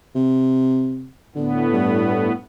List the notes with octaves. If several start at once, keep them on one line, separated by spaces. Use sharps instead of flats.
C3
A2 D3 B3
G2